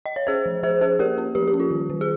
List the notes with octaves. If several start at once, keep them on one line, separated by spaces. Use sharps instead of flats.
D#5
C#5
C#4 G#4 C5
F3
F3 G#4 C5
C#4 G#4 C5
A#3 G4 A#4
C#4
F3 G4
G4
C#4
F4
D#3
D#3
G#4